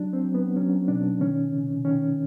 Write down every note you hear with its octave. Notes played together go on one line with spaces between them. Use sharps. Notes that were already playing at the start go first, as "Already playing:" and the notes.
Already playing: F#3 D4
C4
F#3
B3
F#3 C#4
B2 D4
D#3 C#4
C3
D#3 C#4